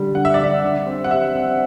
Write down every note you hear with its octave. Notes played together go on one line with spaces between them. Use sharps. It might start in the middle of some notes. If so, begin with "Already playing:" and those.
Already playing: D3 G3
D3 F#5
E5
D5
D3 E5
D3
C4
F#5
G3 E5
C4